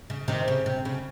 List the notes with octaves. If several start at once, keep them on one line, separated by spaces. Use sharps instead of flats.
C#3
C3 D#3
C#3
C3
C#3